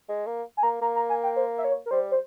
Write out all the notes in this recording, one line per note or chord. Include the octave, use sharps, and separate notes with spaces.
G#3
A#3
G#5
A#3 A#5
A#3 A#5
A#5
G#5
G5
C5
E5
C#5
A#4
G3 C5
C5